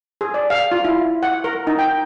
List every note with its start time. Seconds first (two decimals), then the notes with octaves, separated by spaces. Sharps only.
0.21 G#4
0.34 D5
0.50 F5
0.71 F4
0.85 E4
1.23 F#5
1.44 A#4
1.67 D#4
1.79 G5